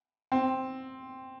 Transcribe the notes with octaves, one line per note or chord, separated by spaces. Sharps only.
C4